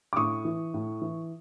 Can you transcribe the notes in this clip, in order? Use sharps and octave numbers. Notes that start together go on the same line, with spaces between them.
D6
A2 C#6 D#6
E3
A2
E3